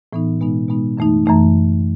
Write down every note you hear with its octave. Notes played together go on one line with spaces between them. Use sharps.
A2 E3 B3 D#4
B2 G#3 B3 D#4
B2 G#3 B3 D#4
F#2 E3 A3 D#4
F#2 E3 A3 D#4